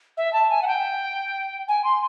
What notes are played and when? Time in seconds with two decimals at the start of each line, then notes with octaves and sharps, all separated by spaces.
0.17 E5
0.33 A5
0.50 G#5
0.62 F#5
0.67 G5
1.68 G#5
1.84 C6